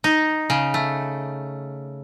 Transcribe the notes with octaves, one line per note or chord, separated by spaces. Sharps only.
D#4
C#3
A3